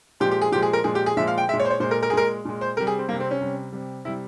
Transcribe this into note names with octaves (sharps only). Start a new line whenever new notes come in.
A#2 F3 G#3 G4
G4
G#4
A#2 F3 G#3 G4
G#4
A#4
A#2 F3 G#3 G#4
G4
G#4
A#2 F3 G#3 E5
F5
G5
G#3 E5
A#2
C#5
C5
C#5
A#2 G#3 C5
A#4
A#4
G#4
A#2 G#3 A#4
A#2 G#3
C5
C3 G3 A#4
G#4
C4
C3 G3 A#3
C4
C#4
C3 G3
C3 G3
C3 G3 E4